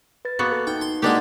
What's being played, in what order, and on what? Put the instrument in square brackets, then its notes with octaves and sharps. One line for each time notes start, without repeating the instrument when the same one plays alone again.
[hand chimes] B4 A6
[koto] A#3 B3 F#4
[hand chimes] A4
[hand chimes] D#4 [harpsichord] G5
[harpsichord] C6
[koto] G#3 D4 G4 [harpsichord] A#3 F#4 [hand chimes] D#4